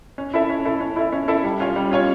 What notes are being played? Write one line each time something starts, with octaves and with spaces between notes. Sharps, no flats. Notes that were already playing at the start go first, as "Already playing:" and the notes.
C#4
E4 A4 E5
C#4
E4 A4 E5
C#4
E4 A4 E5
C#4
E4 A4 E5
G3
C#4 F4 C#5
G3
C#4 F4 C#5